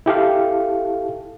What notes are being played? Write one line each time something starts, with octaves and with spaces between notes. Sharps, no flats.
E4 G4 A4 F5